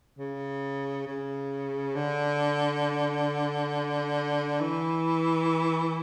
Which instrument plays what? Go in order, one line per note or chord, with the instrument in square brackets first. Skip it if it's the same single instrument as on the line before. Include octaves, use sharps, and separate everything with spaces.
[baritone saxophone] C#3
C#3
D3
E3